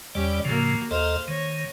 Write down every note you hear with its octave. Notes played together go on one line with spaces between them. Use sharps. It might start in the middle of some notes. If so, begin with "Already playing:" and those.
E2 G3 C#4 G4 D5
A2 C#3 F3 A#3 F#4
D#2 A4 C5 D#5 F5
D#3 C#5